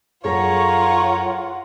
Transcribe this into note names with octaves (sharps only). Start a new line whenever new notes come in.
F#2 F4 G#4 A4 C#5 F#5 A#5